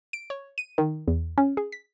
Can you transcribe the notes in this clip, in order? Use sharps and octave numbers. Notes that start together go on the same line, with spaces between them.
D7
C#5
D#7
D#3
E2
C#4
G#4
B6